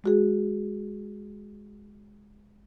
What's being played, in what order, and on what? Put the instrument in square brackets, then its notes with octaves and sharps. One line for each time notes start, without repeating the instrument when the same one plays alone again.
[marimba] G#3 F#4 G#4